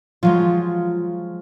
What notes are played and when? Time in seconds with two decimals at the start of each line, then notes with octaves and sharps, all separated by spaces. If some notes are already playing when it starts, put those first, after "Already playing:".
0.23 F3 F#3 G#3 F4